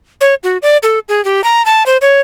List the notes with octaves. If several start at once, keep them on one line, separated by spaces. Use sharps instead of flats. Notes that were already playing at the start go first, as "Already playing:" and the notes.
C#5
F#4
D5
A4
G#4
G4
A#5
A5
C5
C#5